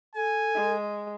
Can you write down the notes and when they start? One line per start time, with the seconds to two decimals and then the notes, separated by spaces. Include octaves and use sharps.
0.15 A4 G#5
0.55 G#3